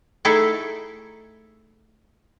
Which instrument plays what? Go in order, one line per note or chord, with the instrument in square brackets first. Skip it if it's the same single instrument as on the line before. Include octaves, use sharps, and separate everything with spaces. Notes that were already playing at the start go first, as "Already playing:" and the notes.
[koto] A3 D#4 E4 G#4 A4 E5